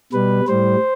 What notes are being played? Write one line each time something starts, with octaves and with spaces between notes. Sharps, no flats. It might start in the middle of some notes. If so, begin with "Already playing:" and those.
B2 G3 B4
A2 G3 C5